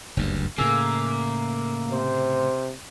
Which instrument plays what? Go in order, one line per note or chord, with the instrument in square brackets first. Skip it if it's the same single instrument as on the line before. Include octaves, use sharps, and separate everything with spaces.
[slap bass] F#1 D2 G2
[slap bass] A2 C#3 [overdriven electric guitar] A#3 [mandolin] G#4 E5
[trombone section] C3 C5